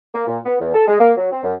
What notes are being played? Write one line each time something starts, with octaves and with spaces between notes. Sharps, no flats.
A#3
A#2
B3
E2
A4
G#3
A#3
F#3
C4
F#2